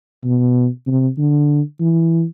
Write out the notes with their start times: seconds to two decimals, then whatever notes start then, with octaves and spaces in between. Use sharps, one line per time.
0.24 B2
0.87 C3
1.18 D3
1.80 E3